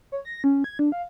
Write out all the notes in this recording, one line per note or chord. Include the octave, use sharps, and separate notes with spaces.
C#5
A#6
C#4
G#6
D4
F5